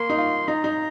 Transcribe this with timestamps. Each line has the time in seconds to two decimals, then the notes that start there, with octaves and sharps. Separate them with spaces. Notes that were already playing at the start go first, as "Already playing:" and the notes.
Already playing: A#3 C6
0.10 D#4
0.18 F4
0.48 D#4 A#5
0.64 D#4